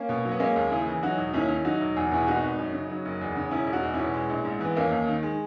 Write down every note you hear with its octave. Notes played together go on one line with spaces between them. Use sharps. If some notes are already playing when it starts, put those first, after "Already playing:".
Already playing: A#3 C#4
B2
F#3
B3
G#3 A#3 C#4
D#2
C#3 E4 G#4
E3
F#3 D#4 F#4
E1
D#2 C#4 E4
D#3
F#3 D#4 F#4
E1
E2 G#4
B2 E4 G#4
G#1 D#4 F#4
G#1
F#2
C#3
F#3
F#1
E2
C#3
E1 C#4 E4
E1
D#4 F#4
E2
C#4 E4
B2
G#3
A#1
G#2
E3 B3
D#2 A#3 C#4
D#2
D#3
G#3